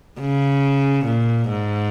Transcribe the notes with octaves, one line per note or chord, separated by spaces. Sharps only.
C#3
A#2
G#2